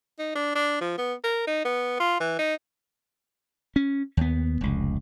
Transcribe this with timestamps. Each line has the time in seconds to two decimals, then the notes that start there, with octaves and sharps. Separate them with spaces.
0.19 D#4
0.36 D4
0.55 D4
0.81 F3
0.98 B3
1.24 A#4
1.47 D#4
1.65 B3
2.00 F4
2.20 E3
2.39 D#4
3.76 C#4
4.17 D#2 B3
4.61 F1 C#2